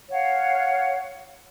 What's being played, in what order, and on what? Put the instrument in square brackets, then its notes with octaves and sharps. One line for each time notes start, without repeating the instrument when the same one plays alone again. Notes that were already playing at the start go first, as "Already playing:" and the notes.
[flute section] C#5 F5 F#5